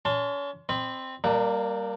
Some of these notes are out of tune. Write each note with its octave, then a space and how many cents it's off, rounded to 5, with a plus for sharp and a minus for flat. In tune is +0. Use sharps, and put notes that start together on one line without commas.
C#4 +35 A5 +20 C6 +0
C4 +0 D#5 -35 B5 +20
G3 -10 A#3 +0 D4 +40